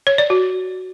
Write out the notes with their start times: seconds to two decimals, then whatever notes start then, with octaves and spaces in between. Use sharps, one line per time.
0.07 C#5
0.18 D5
0.30 F#4